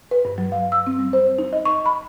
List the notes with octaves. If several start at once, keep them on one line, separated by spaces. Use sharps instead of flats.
B4
G2
F#3
F5
E6
C4
G3
C5
D#4
D#5
C#6
B5